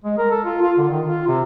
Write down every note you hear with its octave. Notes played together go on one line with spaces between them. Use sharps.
G#3
A#4
A4
F4
F4
D3
D#3
F4
C3